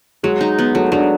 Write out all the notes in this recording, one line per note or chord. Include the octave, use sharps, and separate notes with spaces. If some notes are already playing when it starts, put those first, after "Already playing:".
F#3 G#3
D#4
B3
F#3 A3
F#3 D4